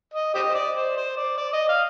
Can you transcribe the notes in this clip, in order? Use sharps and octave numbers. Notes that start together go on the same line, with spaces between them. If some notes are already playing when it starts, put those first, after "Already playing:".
D#5
G4 C5 D#5
C5
D5
C5
C5
D5
D5
D#5
F5